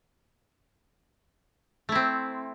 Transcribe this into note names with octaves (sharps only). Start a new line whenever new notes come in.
A3 C4 E4